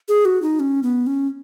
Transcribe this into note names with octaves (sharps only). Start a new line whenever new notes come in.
G#4
F#4
D#4
C#4
B3
C#4